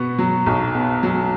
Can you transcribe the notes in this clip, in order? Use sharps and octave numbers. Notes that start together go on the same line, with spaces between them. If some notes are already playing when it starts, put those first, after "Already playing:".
Already playing: B2 B3 C#6
F#3
B1
B3
F#3